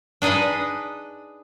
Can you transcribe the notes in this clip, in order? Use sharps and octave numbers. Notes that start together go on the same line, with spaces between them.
D4 D#4 G#4 B4 D#5